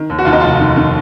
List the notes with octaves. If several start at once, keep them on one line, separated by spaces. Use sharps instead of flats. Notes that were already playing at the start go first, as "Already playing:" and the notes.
Already playing: D#3
D#2
F#4
D#2 F4
D#4
F1 F4
D#3
D#3